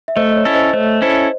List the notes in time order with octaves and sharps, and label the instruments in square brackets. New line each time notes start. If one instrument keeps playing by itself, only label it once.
[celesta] E5
[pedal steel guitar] A3 [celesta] C5 D#5
[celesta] D#5
C#5
[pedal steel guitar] C#4 E4 A4
[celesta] C5 D#5
[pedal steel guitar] A3 [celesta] C5
[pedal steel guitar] C#4 E4 A4 [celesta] C5